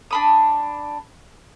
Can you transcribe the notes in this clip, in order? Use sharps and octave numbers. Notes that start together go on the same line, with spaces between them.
D4 B5 D#6